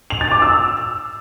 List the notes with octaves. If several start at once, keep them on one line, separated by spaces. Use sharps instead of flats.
F7
A6
D6
E6